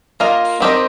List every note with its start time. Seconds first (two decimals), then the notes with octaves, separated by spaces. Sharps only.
0.20 A#3 F4 A#4 D#5
0.60 D#3 C4 G4 A#4 D#5